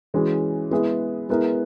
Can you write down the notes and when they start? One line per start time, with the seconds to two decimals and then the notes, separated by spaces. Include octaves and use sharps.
0.14 E3 G#3 C#4 F#4
0.71 G#3 B3 E4 G#4
1.29 G#3 B3 E4 A#4